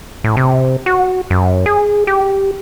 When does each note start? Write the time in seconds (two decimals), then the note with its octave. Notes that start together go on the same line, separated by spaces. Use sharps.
0.24 A2
0.37 C3
0.86 F#4
1.30 F#2
1.66 G#4
2.07 G4